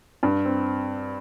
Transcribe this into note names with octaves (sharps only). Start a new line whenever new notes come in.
G2
C4